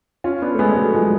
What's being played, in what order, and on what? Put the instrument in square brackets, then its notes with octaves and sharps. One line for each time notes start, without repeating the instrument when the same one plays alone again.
[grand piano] C#4 F4
B3 D4
A3
G#3 B3
G#3
F#3 A3
F3 G#3